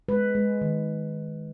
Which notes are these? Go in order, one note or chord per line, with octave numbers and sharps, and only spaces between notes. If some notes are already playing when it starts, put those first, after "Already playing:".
G#3 B4
G#3
D#3